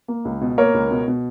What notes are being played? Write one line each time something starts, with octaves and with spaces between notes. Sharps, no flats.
A#3
C#2
B2
A#3 A#4 C#5
C#2
B2
B2